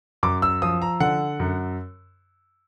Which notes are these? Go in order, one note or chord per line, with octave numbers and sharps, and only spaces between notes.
F#2 D6
E6
F3 D#6
A#5
D3 F#5
F#2